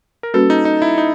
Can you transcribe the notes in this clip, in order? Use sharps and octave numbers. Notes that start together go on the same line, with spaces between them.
A#4
G3 A#3 C#4 F#4 A4 B4
D#4
D#4
E4
D#4